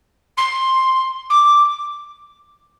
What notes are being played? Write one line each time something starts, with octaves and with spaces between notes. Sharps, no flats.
C6
D6